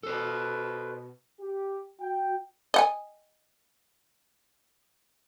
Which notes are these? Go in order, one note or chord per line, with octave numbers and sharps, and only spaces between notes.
B2 A4 C5
G4
F#4 G5
D#5 F#5 G#5